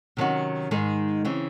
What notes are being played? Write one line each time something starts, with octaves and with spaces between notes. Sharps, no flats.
C3 D#3 F#3 C#4 F#4
G#2 D#3 G#3 D#4 G#4
C#3 E3 C4